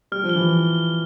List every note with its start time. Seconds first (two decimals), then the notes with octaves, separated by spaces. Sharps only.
0.12 G3 F6
0.24 F3
0.29 G7
0.36 E3